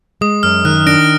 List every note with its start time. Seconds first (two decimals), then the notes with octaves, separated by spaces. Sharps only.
0.21 G#3 D#6
0.43 F#2 F6
0.65 D#3 F#6
0.87 D4 A#6 D7